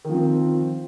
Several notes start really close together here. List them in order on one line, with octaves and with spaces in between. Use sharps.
D#3 F3 C4